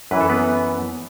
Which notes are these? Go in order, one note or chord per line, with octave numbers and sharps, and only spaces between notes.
F#2 E3 B4
A4
B3 B4